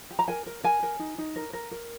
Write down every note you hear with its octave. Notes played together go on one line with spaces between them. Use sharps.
G4
A#5
A#4 G#5
A#4
A#4 G#5
A#4
D#4
D#4
A#4
A#4
A#4